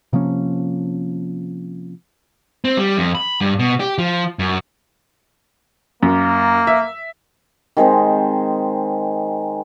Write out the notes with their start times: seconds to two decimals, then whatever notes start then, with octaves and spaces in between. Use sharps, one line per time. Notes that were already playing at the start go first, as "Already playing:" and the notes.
0.13 C3 F3 A#3 C#4
2.65 C4
2.77 G3
2.97 F2
3.15 B5
3.41 G2
3.59 B2
3.80 G4
3.98 F3
4.39 F#2
6.03 F#2 A#3
6.67 E5
7.77 D#3 G#3 C4 C5